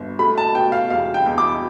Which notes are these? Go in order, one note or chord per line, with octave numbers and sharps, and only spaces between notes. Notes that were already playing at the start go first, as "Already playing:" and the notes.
Already playing: G1
A3 B5
A5
B2 G5
F5
E2 F5
G5
E2
D6